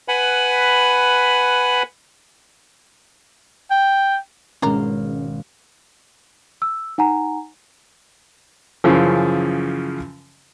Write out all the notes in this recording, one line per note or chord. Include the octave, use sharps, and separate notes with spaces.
B4 F#5 G#5 B5
G5
G#1 B2 G#3 C#4 D4 F4 A#4 F5
E6
D#4 F#5 G#5 A#5
F#2 C#3 E3 F3